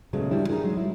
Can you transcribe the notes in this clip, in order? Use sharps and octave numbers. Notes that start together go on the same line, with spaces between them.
A#2 C#3 F#3 G#3 A3 B3
E3 G3 D4 E4
D#4 F#4 G#4 A#4
F#3 G#3
E4